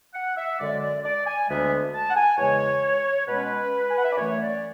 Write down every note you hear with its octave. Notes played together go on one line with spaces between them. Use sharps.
F#5
E5
F#2 D3 G#3 D5
D5
D5
G#5
D2 D3 G#3 B3 E5
A5
F#5
G#5
E2 C#3 G#3 C#5
B2 G#3 C#4 B4
G#5
F#5
E5
D5
F#2 E3 A3 C#4 C#5
D5